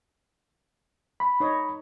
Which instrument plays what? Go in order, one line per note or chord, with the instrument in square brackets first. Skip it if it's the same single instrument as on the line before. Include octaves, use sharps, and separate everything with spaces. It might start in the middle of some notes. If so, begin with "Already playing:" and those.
[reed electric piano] B5
[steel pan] D#4 C#5 D#5